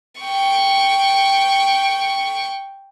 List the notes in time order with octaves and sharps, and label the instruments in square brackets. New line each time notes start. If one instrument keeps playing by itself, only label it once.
[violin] G5 C#6